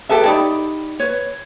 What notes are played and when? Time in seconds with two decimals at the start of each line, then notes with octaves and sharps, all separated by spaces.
0.09 G4 A4 B4 E5
0.25 D#4 G4 D5 B5
0.99 B4 C#5